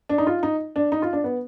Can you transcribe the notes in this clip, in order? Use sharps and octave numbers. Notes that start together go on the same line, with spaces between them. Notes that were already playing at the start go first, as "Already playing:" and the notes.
D4
D#4
F4
D#4
D4
D#4
F4
D4
B3